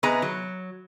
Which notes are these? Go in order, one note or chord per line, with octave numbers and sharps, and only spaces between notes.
C3 B3 G#4 D#5 A#5
F#3